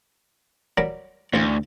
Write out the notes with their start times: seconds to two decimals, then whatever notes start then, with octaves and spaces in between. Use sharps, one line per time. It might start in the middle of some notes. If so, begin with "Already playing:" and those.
0.78 F#3 G3 A#4
1.34 A1 D2 F4